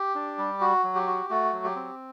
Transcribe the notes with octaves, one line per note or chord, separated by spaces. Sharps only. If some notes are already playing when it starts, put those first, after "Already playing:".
Already playing: G4
D4
G3
F#4
F#3
G4
F#4
A3 F#4
F#3
G4
C4